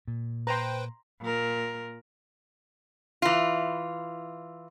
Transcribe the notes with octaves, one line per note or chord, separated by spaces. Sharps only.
A#2
B4 C5 G5 A#5 C6
A#2 A#4
E3 F4